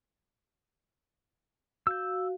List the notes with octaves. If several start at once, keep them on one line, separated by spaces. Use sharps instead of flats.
F#4 F5 E6 G6